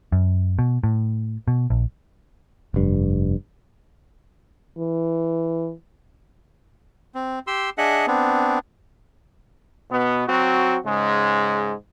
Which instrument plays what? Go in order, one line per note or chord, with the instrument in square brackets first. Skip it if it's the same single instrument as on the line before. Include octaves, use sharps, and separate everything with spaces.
[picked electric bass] F#2
B2
A2
B2
A#1
F1 G2
[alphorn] E3
[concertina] C4
G4 C6 E6
D4 G#4 D#5 E5 F#5 F#6
B3 C4 D4
[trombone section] B2 B3
F#3 C4 F#4
G#2 C#3 G#3